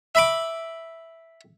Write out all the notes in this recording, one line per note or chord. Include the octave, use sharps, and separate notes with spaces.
E5 B5 D6